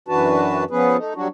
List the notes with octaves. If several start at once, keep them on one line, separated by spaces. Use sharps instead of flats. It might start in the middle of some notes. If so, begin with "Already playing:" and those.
F#2 E3 D4 F#4 B4 A5
F3 B3 C#4 G#4 B4
A3 D#4
F#3 G3 D4 F#4